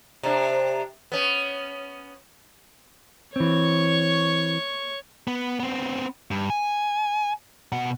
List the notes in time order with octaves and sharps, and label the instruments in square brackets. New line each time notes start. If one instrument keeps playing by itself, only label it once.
[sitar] C3 D4
B3 C#4
[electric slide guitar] E3 C4 [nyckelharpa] C#5 C#6
[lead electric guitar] B3
B3 C4
G2
G#5
B2 F#5